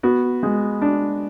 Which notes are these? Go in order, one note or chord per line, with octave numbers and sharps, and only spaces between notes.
B3 F#4
G#3
D4